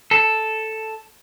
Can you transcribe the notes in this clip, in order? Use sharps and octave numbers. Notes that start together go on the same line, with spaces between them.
A4